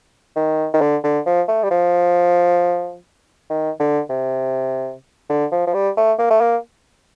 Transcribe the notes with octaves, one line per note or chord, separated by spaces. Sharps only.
D#3
D#3
D3
D3
F3
A3
G3
F3
D#3
D3
C3
D3
F3
F3
G3
A3
A#3
A3
A#3